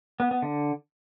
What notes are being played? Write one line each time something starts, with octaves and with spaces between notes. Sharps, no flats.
B3
B3
D3